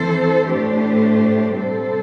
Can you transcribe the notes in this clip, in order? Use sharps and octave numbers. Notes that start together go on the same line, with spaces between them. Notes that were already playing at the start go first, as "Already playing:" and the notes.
Already playing: E3 C4 A4 C5
A2 A3 D4 G4 C5
C3 G3 C4 A4 C5